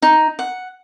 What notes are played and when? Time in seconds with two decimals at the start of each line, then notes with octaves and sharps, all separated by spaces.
0.02 D#4
0.39 F#5